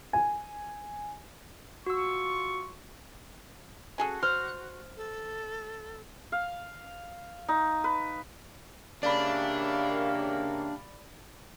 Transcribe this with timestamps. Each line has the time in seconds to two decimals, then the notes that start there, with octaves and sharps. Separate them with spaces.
0.13 G#5
1.86 F4 F#4 C6 C#6 E6
3.98 C#4 F#4 G#4 A4
4.23 C5 F6
4.97 A4
6.32 F5
7.48 D#4
7.84 B4
9.03 C#3 A#3 D4 G4 D5 E5 F5 B5